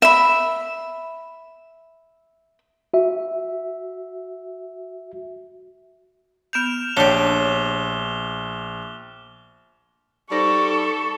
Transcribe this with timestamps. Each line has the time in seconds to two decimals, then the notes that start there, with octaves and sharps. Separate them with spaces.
0.02 E5 B5
2.94 F#4 E5
6.53 B3 F6 G6 E7 F7
6.97 A#1 D4 G4 C#5 D6 F#6 G7
10.31 G3 D#4 A4 C5 C#6 A#6